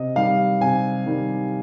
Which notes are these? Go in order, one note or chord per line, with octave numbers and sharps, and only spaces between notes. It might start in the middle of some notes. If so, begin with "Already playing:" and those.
Already playing: C3 D#5
D#3 G3 F5
C3 G#5
D#3 G3